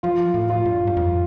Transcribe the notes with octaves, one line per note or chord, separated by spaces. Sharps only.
F3 F4
A2
F4
G2
G2
F2